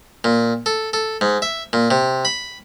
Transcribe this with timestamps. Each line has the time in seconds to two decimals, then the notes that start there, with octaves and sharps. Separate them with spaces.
0.24 A#2
0.66 A4
0.93 A4
1.21 G#2
1.42 E5
1.73 A#2
1.91 C3
2.25 B5